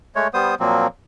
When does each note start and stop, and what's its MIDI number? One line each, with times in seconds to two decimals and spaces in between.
0.15 0.28 56
0.15 0.28 57
0.15 0.28 73
0.34 0.55 55
0.34 0.55 59
0.34 0.55 72
0.34 0.55 87
0.60 0.87 46
0.60 0.87 53
0.60 0.87 54
0.60 0.87 58
0.60 0.87 60